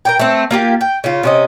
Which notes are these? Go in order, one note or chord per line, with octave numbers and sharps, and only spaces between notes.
A#4 D5 G5
A3 C4
A#3 F4 G4
G5
C#3 F4
C3 C#4 D#5